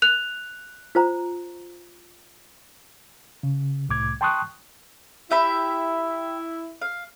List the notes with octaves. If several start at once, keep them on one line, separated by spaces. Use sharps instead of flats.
F#6 F7
F4 C5 A#5
C#3
C2 A2 D6 G#6
G5 A5 C6 C#6 D#6 F#6
E4 G4 E5 B5
F5